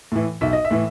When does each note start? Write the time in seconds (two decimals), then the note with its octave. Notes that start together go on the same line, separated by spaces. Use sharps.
0.12 A2 E3
0.41 B1 E5
0.53 D#5
0.65 E5
0.71 A2 E3